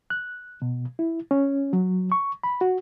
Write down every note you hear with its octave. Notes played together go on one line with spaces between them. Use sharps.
F#6
B2
E4
C#4
F#3
C#6
B5
F#4